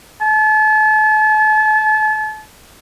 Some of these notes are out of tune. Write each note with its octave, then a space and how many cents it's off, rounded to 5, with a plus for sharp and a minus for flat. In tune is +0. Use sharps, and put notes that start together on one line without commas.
A5 -35